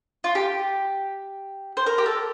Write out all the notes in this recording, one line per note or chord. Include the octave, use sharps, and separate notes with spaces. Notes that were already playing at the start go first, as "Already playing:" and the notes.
F4
G4
C5
A#4
G4
A4